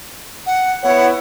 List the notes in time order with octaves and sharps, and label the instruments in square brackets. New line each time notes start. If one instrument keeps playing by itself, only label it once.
[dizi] F#5
[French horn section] B3 E4 C#5 [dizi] F#5